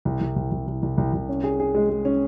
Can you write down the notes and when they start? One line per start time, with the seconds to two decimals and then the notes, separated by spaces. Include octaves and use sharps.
0.05 C2
0.21 C2
0.36 C2
0.52 C2
0.67 C2
0.82 C2
0.98 C2
1.13 C2
1.29 C#4
1.44 G#4
1.60 G#4
1.75 G#3
1.90 G#3
2.05 C#4